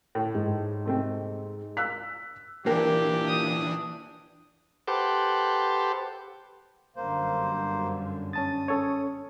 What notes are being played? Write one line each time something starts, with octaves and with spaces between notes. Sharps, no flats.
A2
G#2
C3 A3 C4
E6 F#6 B6
A#2 E3 D4 G4 A#4 G5
D#6
G4 A4 B4 C5 F#5 D6
G1 F#2 D3 A#3 C5
C#4 A5 D#6 A6
C#4 A4 C#5